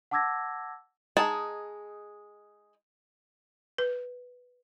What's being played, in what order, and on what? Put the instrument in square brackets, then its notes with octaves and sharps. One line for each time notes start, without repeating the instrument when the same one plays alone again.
[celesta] F#5 A5 D6 E6 G#6 A#6
[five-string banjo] G#3 D#4 G#4 A5
[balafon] B4